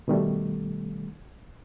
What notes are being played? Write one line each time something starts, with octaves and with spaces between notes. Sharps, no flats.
B2 D#3 G3 A3